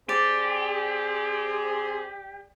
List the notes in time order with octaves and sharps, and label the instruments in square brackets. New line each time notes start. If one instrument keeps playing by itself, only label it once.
[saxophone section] C4 G#4 [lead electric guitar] G4 [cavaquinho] D5